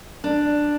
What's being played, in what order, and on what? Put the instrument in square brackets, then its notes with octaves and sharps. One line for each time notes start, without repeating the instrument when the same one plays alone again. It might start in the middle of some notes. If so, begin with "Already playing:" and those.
[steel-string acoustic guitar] D4